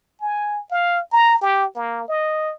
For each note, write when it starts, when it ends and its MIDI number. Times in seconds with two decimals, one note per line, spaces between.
0.21 0.61 80
0.71 1.00 77
1.12 1.40 82
1.41 1.66 67
1.75 2.06 58
2.09 2.54 75